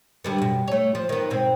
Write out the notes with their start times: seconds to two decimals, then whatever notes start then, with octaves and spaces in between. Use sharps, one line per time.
0.24 D3 G3 B3
0.38 F#2 B2
0.68 A3 C#5
0.95 F3
1.09 D#3 B3
1.30 G#2 B2 C4